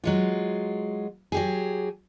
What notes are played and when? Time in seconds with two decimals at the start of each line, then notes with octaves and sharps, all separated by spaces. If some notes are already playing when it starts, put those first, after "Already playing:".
0.04 F#3 G#3 F4
1.32 F#3 G4 G#4